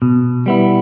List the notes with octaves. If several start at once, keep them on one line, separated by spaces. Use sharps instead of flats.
B2
G3 B3 E4